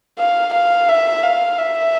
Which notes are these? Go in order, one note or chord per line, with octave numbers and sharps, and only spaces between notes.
F5
F5
E5
F5
E5